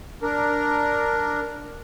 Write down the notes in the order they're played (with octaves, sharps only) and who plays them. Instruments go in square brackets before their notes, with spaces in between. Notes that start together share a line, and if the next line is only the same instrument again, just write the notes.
[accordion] D4 A#4